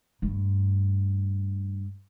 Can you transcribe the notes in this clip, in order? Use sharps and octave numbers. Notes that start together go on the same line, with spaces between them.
G2 A3